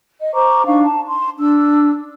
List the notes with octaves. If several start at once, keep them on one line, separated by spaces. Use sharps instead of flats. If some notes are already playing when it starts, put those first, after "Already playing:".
D#5
C5 A#5 C#6 D6
D4 D#4 F5 C#6
A5
C6
D4 E6